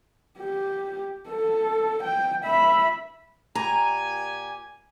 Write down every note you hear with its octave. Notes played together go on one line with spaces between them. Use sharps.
G4
A4
G5
E5 B5
A#2 G4 G#5 A#5